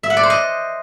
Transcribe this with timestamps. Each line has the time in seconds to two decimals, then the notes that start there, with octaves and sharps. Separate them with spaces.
0.03 E5
0.10 F#5
0.17 D5
0.23 C5
0.30 D#5